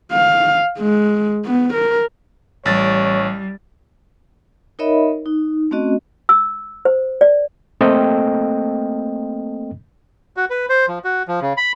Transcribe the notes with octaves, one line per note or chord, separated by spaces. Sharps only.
F5
G#3
B3
A#4
A1 G3 C#5 A6
D#4 A#4 C#5 D#5 E5 B5
D#4
A3 C4 C#4 F#4 D#5
E6
C5
D5
A3 A#3 C4 A4 D#5 G5
F#4
B4
C5
F3
F#4
F3
C#3
B5